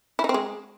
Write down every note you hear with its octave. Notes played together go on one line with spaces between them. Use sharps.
E4
D#4
C4
G#3